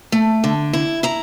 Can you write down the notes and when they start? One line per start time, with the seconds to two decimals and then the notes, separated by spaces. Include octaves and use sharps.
0.12 A3
0.44 D3
0.73 E4
1.03 E4 A#5